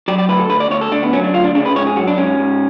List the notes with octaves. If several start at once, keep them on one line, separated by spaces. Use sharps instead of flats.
F#3 D5
D5
D2 B4
A4
D2 B4
D5
D2 C#5
A4
D2 D4
B3
F#3 C#4
D4
D2 F4
D4
C#3 D4
B4
G#2 C#5
G#4
F#3 F#4
D4
G#2 C#4
G#2